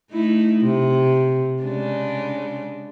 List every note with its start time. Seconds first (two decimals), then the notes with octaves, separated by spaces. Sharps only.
0.11 A3 D#4 E4
0.61 C3
1.63 C#3 G#3 D4